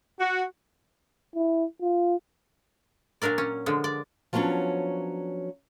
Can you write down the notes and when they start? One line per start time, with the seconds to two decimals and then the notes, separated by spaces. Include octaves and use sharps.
0.19 F#4
1.36 E4
1.82 F4
3.22 A#2 F#3 D4 A#4 D5
3.38 C#4
3.66 D3 F3 G#3
3.84 D5
4.33 F3 F#3 B3 C#4 D4